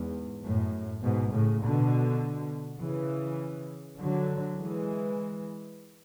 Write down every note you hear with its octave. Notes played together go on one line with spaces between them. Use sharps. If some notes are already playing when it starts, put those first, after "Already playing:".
Already playing: E2 G#2
F#2 A2
G#2 B2
A2 C#3
B2 D3
C#3 E3
D3 F#3
E3 G#3